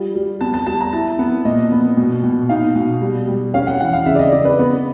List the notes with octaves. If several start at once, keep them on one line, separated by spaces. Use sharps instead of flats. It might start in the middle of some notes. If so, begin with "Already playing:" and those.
Already playing: G3 F4
G3
B3 A5
A5
G3 A5
A#5
E4 A5
B3
A#2 D#5
B3
B2
B2
D#4 F5
B2
G3
G3
C#4 F5
F#5
E3 F#5
F5
C#3 E5
D5
D#5
C#3 D5
B4
B3